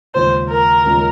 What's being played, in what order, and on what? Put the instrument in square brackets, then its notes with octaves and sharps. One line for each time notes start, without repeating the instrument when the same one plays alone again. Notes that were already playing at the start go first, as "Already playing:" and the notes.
[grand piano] D#2 C#3 G#3 C#4 F4 [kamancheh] C5
[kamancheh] A#4
[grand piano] D#2 C#3 G#3 C#4 F4